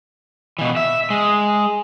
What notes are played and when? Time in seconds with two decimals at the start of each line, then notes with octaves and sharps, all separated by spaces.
0.59 B2 E3
0.76 E5
1.10 G#3